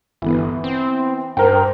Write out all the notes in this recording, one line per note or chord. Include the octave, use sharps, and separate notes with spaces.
G1 E3 B3
C4
G2 A#4 C5 G5